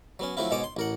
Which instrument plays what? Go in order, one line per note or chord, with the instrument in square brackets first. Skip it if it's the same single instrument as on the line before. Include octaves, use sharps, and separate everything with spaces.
[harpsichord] F#3 B3 C#4
F3 F#3 A3 C4 E4 F4
G#2 B2 G#3 C#5 A5 D6
C6
A1 A#4 F#5